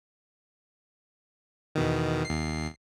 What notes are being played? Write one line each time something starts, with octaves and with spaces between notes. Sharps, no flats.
E2 B2 D#3
D#2 C7